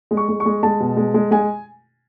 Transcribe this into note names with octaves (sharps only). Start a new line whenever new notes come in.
G#3
C#6
G#3
C#6
G#3
G#3 A5
B2
G#3
G#3
G#3 G#5